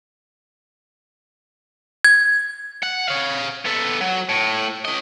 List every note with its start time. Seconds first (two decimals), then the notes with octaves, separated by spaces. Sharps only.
2.04 G#6
2.83 F#5
3.08 C#5 F5
3.65 B3 A4
4.01 F#3
4.29 A2
4.85 C#4 D#5